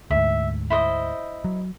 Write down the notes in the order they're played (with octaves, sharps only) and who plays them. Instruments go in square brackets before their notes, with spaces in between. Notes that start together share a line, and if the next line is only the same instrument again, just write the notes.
[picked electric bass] D2 G#2 [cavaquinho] E5
[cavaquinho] E4 C5 D#5
[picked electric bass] F#3